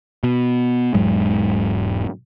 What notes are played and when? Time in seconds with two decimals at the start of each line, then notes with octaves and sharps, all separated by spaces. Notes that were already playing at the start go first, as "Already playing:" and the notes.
0.24 B2
0.94 E1 G#2 F#3 G#3